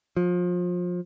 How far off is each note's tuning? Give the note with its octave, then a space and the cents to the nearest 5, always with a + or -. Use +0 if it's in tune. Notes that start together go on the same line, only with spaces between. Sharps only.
F3 +30